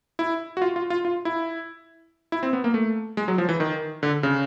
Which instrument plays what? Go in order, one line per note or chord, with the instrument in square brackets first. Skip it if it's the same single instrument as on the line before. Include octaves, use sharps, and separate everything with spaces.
[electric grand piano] E4
F#4
F4
F4
F4
F4
E4
E4
C4
B3
A#3
A3
G#3
F#3
F3
E3
D#3
D3
C#3